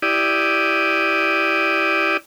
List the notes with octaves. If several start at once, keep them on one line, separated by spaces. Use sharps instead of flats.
E4 G4 D5 D#6